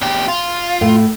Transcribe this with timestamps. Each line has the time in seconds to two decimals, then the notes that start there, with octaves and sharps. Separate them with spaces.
0.02 E2 G4
0.28 F4
0.81 A2